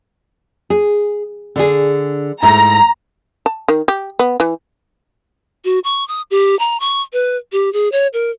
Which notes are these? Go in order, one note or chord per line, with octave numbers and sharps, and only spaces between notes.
G#4
D3 D4 G#4
G#2 A3 E4 A#5
A5
D#3
G4
B3
E3
F#4
C#6
D#6
G4
A#5
C#6
B4
G4
G#4
C#5
A#4